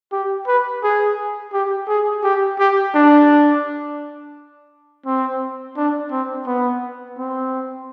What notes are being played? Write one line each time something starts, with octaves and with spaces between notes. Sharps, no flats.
G4
B4
G#4
G4
G#4
G4
G4
D4
C4
D4
C4
B3
C4